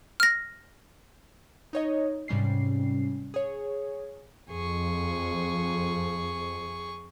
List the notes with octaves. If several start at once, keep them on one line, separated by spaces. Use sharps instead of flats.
F6 A#6
D#4 C#5 D#5
G#2 C3 G3 C#4 C7
G#4 C#5
F2 G#4 C#6